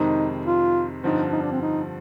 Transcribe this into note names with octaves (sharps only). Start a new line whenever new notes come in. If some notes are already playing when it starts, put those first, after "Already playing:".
Already playing: F2 C3 D#3 G#3 C4 D#4
F4
G2 D3 F3 C4 D#4
D#4
D4
C4
D#4